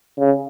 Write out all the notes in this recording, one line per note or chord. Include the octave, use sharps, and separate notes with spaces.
C#3